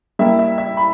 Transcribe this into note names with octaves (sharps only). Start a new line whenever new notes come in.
G3 A#3 E4 E5
E5
E5
B5